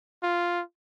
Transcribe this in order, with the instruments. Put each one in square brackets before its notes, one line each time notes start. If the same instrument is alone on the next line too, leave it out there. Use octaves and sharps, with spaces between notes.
[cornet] F4